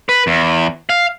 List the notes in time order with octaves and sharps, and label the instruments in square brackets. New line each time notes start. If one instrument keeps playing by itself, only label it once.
[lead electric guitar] B4
E2
F5